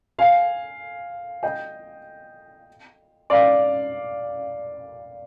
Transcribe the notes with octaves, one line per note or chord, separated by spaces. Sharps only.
F5 G#5
D#5 G5
D5 F5